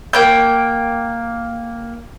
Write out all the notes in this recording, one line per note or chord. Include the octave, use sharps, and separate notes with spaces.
A#3 G5 G6